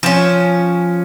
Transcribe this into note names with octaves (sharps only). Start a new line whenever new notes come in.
F3 C#4